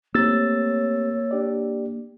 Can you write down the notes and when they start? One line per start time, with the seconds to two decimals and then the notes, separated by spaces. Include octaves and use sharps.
0.15 A3 A#3 C4 G4 C#5 E6 A6
1.31 D4 G4 D5